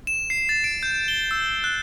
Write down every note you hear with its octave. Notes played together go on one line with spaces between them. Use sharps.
E7
C7
A6
D7
G6
G7
E6
F#6